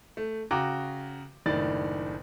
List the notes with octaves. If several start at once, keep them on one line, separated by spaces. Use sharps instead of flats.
A3
C#3 F#4 G5 A#5 D6
F#1 A2 D#3 D4 D5 A6